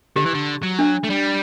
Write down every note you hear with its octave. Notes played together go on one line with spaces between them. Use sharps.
D3 G4
E3
D3
F#3
D4
A3
G3